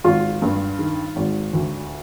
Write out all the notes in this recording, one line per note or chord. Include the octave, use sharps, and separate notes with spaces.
G#1 F4
G2
D#3
G#1
D2